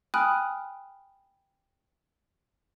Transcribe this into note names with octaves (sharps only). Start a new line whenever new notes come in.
G5 G#5 B5 D#6 F6 F#6